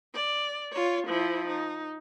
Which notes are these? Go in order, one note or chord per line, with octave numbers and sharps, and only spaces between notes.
D5
F4 C#5
F3 E4
D#4